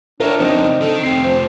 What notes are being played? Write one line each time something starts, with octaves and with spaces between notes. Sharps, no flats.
D4 F4 A#4 C#5 E5
F2 C#3 C4 D#4
D#3 A4
F2 C3 C4 C7
F3 C5